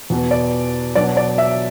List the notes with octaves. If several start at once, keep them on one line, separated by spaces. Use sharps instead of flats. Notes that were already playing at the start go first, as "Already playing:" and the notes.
E2 B2 B3
D5
B2 F#3 D4 D5
D5
E5